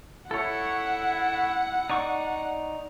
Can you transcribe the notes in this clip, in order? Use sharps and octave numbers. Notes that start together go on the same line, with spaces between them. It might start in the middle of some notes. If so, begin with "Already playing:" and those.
E4 A4 C#5 F#5
D#4 D5 C#6